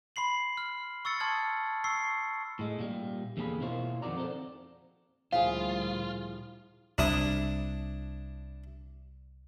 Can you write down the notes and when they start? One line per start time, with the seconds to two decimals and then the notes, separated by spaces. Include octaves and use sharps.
0.16 B5 C6 C7 F#7
0.57 F6
1.05 C#6 E6 A6 C#7
1.20 A5 C6 D#6 F6 G#6 C#7
1.84 C#6 E6 C7
2.59 A2 G#3
2.79 A#2 G3
3.37 E2 D3 A#3 G#4 G#5 B5
3.61 B2 A#3 E4 F4 C5 C#5
4.02 F2 D#3 F#4 D5 A#5
4.17 C4 A4 B4 C5 D5
5.32 D2 A#2 F3 G3 E4 F4 G#4 F5
6.98 C2 D4 E4 D#6